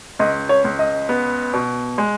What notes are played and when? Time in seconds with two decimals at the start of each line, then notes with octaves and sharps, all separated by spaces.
0.19 C#2 D#5
0.49 C#5
0.65 C#2
0.79 D#5
1.09 B3
1.54 B2
1.98 G#3